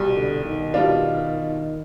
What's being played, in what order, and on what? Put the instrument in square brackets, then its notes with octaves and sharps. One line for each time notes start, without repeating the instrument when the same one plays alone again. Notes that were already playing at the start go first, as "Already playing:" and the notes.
Already playing: [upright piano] C2 B2 G3
[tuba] D3
D#3
[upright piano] B2 G3 D4 F4